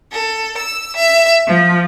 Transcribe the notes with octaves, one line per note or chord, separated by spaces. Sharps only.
A4
E6
E5
F3